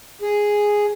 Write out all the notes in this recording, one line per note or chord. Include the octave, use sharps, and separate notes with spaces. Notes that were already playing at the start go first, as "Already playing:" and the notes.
G#4